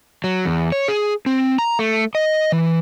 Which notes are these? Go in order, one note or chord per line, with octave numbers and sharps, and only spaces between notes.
F#3
E2
C#5
G#4
C4
A#5
A3
D#5
E3